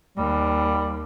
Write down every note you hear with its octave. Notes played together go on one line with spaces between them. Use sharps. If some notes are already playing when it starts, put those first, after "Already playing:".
D#2 G3